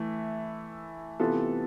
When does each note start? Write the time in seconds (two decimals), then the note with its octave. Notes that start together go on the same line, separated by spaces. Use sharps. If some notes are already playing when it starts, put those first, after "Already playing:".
Already playing: E3 A3 E4
1.20 C3 E3 B3 F4 A4